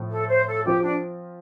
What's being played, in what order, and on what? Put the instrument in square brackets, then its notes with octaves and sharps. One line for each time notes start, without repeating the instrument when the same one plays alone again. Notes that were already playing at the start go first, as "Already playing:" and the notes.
Already playing: [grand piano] A2 F3 A3
[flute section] A4
C5
A4
[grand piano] F3 C4 F4 [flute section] G4
[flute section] D4